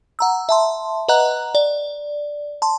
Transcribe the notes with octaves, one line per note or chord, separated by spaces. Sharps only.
F#5 A#5 E6
E5 A5 C6
B4 D#5 F#5 A#5 F#6
D5
A5 C6